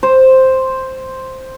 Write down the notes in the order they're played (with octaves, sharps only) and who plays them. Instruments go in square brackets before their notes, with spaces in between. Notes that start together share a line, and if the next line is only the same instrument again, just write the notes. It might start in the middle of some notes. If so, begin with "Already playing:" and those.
[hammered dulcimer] C5